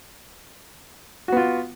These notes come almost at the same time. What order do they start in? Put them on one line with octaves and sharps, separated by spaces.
F#4 B3 F4